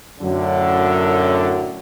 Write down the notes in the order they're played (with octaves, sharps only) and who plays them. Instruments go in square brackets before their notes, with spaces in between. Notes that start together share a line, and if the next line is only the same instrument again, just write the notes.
[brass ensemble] F#2 A2 D3 F#3